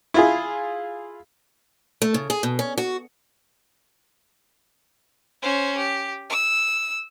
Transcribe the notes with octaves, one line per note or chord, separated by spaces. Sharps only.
E4 F4 G#4
A3
C#3
G#4
B2
C#4
F#4
C#4 C5
G4
E6